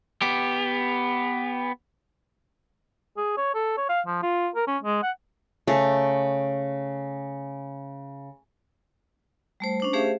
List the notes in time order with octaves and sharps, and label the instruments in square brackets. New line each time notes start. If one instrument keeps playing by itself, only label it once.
[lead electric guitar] B3 G4
[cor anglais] G#4
C#5
A4
C#5
F5
F3
F4
A#4
C#4
G#3
F#5
[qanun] C#3 A3
[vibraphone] G3 A3 C5
C#4 D4 C5
A3 G4 G#4 C5 E5 F5